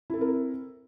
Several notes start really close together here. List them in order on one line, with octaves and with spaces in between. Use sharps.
E4 A4 C4 A#4